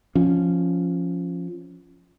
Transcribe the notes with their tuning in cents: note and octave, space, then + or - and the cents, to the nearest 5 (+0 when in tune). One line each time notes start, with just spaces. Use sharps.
F3 +0 C#4 +0